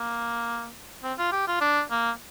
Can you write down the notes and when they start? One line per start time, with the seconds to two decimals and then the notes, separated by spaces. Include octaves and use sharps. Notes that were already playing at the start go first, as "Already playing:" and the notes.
Already playing: A#3
1.03 C4
1.18 F4
1.32 G4
1.48 F4
1.61 D4
1.91 A#3